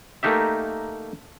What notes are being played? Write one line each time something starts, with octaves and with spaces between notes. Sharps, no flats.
A3 A#3 D#4 G4 E5